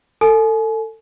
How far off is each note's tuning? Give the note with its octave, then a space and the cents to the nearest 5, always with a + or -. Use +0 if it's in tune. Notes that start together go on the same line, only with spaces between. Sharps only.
A4 +25 G#5 +40